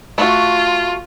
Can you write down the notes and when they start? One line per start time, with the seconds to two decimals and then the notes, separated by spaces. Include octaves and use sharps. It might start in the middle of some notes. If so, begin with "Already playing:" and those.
0.18 A3 F4 F#4